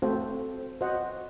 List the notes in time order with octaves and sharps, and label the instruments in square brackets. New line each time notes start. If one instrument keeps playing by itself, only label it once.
[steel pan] A3 C4 F#4 A4 C5
F#4 C5 D#5 F#5